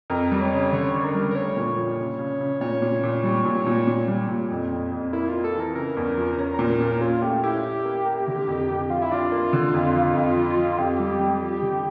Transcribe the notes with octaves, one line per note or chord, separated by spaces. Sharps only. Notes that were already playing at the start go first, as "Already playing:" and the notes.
F2 A#4
G3
C#5
C#3
D3 C#5
D4
A#4
G3
A#4
A3 C#5
A#2
F3
C#3
C#3
C#3
A#2 C#5
A#2
A#2
G3
A#2
A#2
A#2
G3
A#2
F2
F2
F2
A#3 E4
A#3 F4
A4
E3 A#4
C#3 A#4
E2
F3
C#4
A#2 A#4
A#4
A#2
A#4
C#4 F4
A3 G4
E4 G4
E4
A#3
A#4
D3
F2
F2
F3 F4
E4
D4 F4
A#3
D3
F2
F3
F2
F3
F3
F2 G4
G3
G3
F3
D3